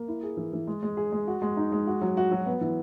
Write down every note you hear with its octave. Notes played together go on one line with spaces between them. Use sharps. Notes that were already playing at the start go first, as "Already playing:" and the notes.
Already playing: A#3
E4
G#4
E3
E3
G#3
G#3
G#4
G#3
F#4
G#3
D#4
G#3
F#4
F#3
F#4
F#3
B3
E3